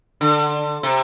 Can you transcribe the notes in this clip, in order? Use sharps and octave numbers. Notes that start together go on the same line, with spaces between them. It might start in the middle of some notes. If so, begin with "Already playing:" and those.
D3
C3